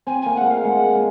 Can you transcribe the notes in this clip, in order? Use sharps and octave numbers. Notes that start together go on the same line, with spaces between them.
C4 G#5
A#3 G#5
G#3 F#5
A#3 F5
G#3 F#5
A#3
G#3